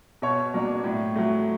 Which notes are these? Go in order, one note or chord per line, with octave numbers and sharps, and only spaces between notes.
B2 C#5
F#3 A#3 D4
A2
F#3 A3